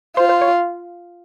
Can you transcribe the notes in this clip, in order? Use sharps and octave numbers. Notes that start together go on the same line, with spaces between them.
F4 C5
C5
C#5